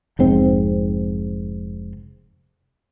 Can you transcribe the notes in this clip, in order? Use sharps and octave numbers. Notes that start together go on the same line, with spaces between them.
F1 G#2 C4